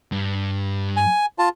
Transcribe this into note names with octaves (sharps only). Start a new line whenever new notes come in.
G2
G#5
F4 A5